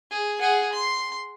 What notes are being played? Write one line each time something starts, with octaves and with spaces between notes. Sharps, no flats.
G#4
G#4 F#5
C6